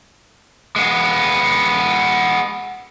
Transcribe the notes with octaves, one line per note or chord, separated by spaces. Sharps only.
G#3 B3